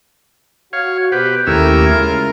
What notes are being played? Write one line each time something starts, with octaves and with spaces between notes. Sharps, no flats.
F#4 C#5 F5
B2 G4 B4 C5
D#2 A3 C#4 E4 G4 A#4 E6
C#3 G#3 E4 F4